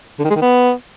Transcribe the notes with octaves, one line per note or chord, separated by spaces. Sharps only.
D3
D#3
G#3
D#3
B3